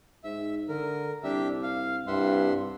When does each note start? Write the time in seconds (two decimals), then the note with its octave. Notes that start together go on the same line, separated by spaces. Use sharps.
0.24 G#2 E5
0.69 D3 A#4
1.23 C2 D4 G4 E5
1.63 F5
2.07 C2 G2 E5 F#5 C6